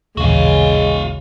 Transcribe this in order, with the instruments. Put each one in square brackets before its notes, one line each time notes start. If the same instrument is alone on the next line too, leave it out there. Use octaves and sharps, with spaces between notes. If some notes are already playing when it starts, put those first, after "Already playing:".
[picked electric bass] D#1 A1 [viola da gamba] C#3 [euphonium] G#3 [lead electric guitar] F#4 F5